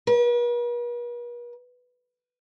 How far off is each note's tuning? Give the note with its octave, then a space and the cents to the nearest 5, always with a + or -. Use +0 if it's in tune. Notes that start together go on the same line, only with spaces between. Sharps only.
B4 -45